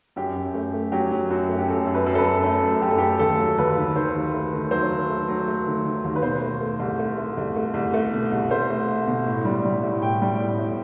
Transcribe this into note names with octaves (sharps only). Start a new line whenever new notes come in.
F#2 G4
F#2
A3
A3
F#3 G4
F#3
F#2 F#4
A3
G4
F#2 A4
F#2
B4
F#2
A4
B4
F#2
A3 A4
F#2
F#2 G4
A4
A3 G4
D#2 A4
F#3
D#2 B4
D#3
D#3 C5
D#2
A3
D#3
F#3 C5
D#3
A3
F#3
A3
D#3
D#3
D#2
B4
B2 C5
A3
A3
C2
A3
A3
C2
A3
C2
A3
B2
C2
A3 C5
A3
A3
B2
A2
G3
G3
A2
A2 G5
G3
A2
A2